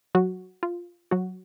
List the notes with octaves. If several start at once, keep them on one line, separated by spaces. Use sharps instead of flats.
F#3 F#4
F4
F#3 F#4